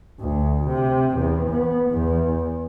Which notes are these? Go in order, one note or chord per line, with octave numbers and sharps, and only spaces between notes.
D2
C3
E2
B3
E2